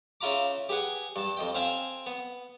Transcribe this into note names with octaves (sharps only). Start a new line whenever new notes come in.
C#3 E4 F4 A#5 D6
G4 G#4 B4 F#5 G#5
G2 A5
F2 D#5 G5
C4 C5 F5 G#5 A5 B5
B3